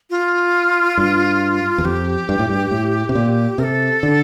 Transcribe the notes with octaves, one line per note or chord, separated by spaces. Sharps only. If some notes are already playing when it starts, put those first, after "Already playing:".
F4
G2
E2
F2 G4
G2
A2
G2
A2
C3
A#2
C3 A#4
A4
D3